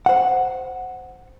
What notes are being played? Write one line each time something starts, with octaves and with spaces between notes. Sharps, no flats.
C5 F#5